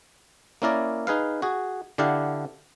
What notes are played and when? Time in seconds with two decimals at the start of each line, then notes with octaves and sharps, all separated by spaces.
0.62 A#3 C#4 E4 A#4 D5
1.07 D#4 G#4 B4 F5
1.42 F#4 G#4
1.98 D3 D4 E4 G4 F5 F#5